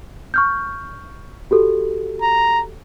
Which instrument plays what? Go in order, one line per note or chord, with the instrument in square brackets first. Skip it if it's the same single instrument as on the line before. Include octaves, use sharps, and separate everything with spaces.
[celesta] C#6 F6 G6
F#4 G4 A4
[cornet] A#5